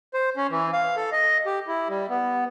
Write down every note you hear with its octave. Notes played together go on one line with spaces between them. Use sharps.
C5
C#4
E3
F5
A4
D#5
G4
E4
G3
B3